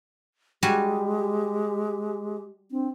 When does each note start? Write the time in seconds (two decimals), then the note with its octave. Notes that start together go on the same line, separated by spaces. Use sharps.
0.63 G3 G#3 F#4 G4 G#5
2.71 C4 D4